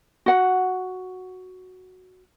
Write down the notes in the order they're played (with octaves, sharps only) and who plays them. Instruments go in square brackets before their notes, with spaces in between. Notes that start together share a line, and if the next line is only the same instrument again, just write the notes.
[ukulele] F#4 F#5